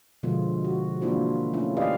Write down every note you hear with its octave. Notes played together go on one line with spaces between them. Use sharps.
B2 D3 F3 G#3 B3 F4
F#4
E3 A#3 D4 E4 F4 C5
A3 C#4 E4 F4
E4 G4 B4 D5 D#5 F5